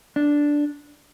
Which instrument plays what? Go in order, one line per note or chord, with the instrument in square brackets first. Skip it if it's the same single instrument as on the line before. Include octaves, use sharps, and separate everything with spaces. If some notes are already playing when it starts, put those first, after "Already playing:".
[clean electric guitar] D4